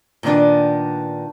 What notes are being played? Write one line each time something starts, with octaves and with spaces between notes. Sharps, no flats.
A#2 D#3 B3 D4